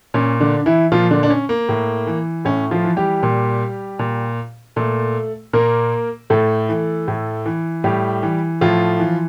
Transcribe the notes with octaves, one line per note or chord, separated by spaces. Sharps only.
A#2 C#4
D3 D4
E3 E4
A#2 F3 F4
D3 D4
D4
C#4
A#3
A2
E3
A2 C#4
F3 F4
E3
G3 G4
A#2
A#2
A#2 A3 A4
A#2 A#3 A#4
A2 A3 A4
E3
A2
E3
A2 G3 G4
E3
A2 F3 F4
E3